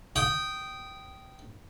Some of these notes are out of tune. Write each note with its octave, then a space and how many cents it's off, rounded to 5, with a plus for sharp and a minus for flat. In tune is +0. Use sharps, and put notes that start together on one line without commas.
G5 -15 D#6 -5